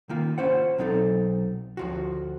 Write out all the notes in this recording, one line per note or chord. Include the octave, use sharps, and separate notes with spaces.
D#3 A#3 F4
C#4 F4 C5 F#5
B1 F#3 C4 D#4 A4
D2 F3 F#4